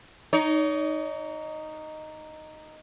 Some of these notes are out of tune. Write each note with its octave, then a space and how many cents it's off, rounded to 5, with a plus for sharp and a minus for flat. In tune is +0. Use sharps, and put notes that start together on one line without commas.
D#4 -5 C#5 +40